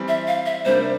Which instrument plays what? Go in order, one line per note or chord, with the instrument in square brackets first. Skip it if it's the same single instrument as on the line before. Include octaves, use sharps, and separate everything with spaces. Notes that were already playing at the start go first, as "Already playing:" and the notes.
Already playing: [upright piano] E3 G3 C4
[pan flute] E5
F5
E5
[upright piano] C3 G3 A#3 D4 [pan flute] C5